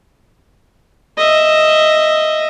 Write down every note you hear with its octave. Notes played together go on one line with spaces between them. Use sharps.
D#5 E5